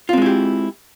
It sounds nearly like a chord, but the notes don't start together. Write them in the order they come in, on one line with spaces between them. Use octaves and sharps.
F4 C4 G#3 E4 G4